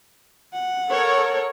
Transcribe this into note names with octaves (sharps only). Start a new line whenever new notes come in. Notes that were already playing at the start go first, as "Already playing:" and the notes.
F#5
A4 A#4 C#5